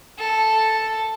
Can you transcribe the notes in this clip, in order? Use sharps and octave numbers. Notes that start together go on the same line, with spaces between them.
A4